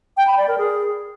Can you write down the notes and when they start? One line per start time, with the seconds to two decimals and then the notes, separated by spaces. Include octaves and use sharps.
0.17 G5
0.27 B5
0.38 D5
0.48 A#4
0.58 G#4